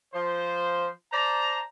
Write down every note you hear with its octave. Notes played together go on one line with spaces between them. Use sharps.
F3 C5
C5 D5 A5 A#5